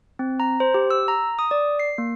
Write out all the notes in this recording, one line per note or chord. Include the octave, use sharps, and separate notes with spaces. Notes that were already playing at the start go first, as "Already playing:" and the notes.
C4
A#5
C5
G4
E6
A#5
D#6
D5
C7
A#3